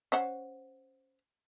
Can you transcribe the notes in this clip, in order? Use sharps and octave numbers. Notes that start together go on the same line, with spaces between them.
C#4 C5 F#5